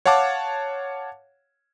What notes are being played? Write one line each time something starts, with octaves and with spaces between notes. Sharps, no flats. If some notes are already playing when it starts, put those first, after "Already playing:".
C#5 F5 F#5 A5 D6